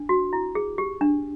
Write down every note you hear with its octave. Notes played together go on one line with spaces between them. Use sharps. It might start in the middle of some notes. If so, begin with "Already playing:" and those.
Already playing: D4
F#4
E4
G#4
G4
D4